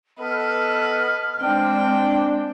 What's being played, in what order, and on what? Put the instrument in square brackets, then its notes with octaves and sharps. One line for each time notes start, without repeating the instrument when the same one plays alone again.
[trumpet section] B3 A4 D#5 [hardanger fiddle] B4 [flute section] F6
[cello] G#3 C4 [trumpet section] D4 [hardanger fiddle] G5